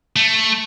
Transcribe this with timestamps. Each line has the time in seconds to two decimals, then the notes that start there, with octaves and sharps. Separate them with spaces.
0.16 A3